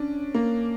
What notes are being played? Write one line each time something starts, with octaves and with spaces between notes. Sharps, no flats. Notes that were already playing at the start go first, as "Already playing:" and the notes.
Already playing: C#4 D4
A#3